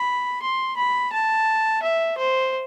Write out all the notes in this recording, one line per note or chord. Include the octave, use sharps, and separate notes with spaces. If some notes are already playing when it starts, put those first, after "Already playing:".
Already playing: B5
C6
B5
A5
E5
C5